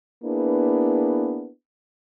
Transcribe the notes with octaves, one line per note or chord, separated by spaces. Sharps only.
A#3 B3 D4 E4 G#4 B4